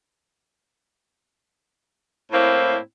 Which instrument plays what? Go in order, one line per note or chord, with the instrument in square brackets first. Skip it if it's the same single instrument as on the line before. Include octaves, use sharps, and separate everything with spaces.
[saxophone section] A2 A#3 C4 E4